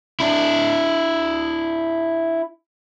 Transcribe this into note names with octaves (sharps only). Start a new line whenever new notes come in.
D4 E4